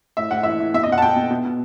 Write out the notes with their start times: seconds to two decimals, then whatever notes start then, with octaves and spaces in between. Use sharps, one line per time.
0.17 A2 E5
0.31 A2 F#5
0.43 E3 E5
0.60 E3
0.74 B2 E5
0.83 D#5
0.88 B2 F#5
0.98 A5
1.02 B2 G5
1.16 B2
1.31 B2
1.45 B2